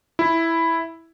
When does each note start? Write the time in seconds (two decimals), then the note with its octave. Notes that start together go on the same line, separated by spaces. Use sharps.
0.19 E4